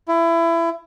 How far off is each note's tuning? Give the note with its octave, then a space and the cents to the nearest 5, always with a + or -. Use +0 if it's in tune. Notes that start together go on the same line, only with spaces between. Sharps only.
E4 +25